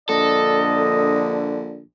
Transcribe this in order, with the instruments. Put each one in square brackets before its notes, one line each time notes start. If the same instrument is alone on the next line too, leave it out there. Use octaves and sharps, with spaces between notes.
[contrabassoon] A#1 [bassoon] D3 [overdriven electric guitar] A4 [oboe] D#5